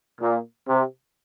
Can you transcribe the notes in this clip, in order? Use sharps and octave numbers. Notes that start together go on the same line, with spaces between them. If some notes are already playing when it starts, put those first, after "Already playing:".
A#2
C3